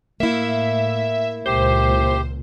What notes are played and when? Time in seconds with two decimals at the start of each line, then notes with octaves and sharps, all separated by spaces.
0.20 A2 A#3 E4 E5
1.46 C#2 A#2 G4 C5